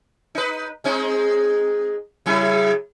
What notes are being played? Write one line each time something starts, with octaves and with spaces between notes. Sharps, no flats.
D#4 B4
G#3 C4 D#4
C#3 F#3 E4